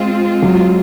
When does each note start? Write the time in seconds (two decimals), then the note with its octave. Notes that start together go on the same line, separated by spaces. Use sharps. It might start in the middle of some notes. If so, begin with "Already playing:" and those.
Already playing: G#3 C4 F4
0.42 F#3